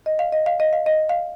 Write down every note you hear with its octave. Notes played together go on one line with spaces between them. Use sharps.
D#5
F5
D#5
F5
D#5
F5
D#5
F5